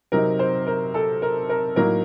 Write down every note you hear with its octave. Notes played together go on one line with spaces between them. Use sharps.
C3 F#3 C4 D#4 A#4
C5
A#4
A4
A#4
A#4
A2 F#3 A#3 D#4 A#4